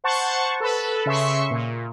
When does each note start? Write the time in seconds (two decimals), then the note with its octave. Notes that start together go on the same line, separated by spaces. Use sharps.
0.04 C5 F#5 A5 C#6
0.60 A4 B4
1.06 C#3 E5 C6 C#6
1.50 A#2